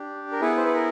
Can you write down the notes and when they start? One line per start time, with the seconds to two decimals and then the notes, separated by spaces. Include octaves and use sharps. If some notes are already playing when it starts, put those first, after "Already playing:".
Already playing: D4 G4
0.32 A#4
0.41 B3 E4 G#4 B4
0.57 C5
0.66 B4
0.74 A#4